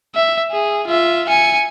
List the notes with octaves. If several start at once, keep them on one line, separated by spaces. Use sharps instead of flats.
E5
G#4
F4 E5
G#5 C#7